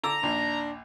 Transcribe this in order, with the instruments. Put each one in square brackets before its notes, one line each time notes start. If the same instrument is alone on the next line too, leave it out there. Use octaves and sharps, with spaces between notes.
[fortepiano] D3 D6 E6 [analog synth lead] A#5
[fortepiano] A#1 D#2 [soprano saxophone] D4